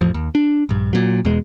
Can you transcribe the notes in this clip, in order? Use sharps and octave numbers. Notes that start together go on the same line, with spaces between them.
A1 F2 F3
D#2
D4
A#1 G2
A#2 F#3
E2 B2 G#3